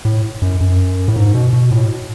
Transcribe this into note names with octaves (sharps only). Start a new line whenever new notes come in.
A2
F#2
F#2
A2
G#2
B2
B2
A2